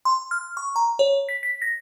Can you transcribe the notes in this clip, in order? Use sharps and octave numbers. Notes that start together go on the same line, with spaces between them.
C6
F6
C#6
A#5
C#5
B6
B6
A#6